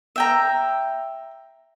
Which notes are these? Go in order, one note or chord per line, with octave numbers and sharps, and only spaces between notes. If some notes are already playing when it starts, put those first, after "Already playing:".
E5 G5 A#5